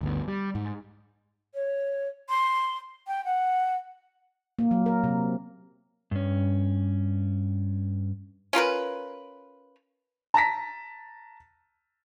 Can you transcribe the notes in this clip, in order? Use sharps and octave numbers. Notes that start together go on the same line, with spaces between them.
G1 D2 G2 B3
G3
G#2
C#5
C6
G5
F#5
A#3
F#3
A#4
C3
G2 C#4
C#4 F4 A#4 B4
A5 A#5 A#6 B6